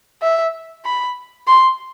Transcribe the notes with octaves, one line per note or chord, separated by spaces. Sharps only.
E5
B5
C6